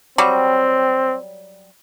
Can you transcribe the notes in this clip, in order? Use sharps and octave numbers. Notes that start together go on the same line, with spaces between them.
F#3 G3 C4